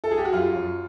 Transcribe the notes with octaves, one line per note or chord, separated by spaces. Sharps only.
A4
G#4
G4
F#4
F#2 F4
F#2